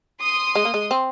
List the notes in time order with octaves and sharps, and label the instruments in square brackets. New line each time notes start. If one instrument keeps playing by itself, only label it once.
[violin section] C6 D#6
[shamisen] G#3
A#3
G#3
C4